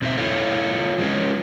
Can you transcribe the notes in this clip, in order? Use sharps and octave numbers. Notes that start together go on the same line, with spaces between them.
B2 C4 D#4 G4 C5 E5
E4 F4 A4 C#5 F5
F3 G#3 C4 C#4